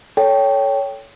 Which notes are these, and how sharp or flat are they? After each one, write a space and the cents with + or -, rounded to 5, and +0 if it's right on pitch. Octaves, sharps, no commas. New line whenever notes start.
A4 +0 C#5 +15 G5 +0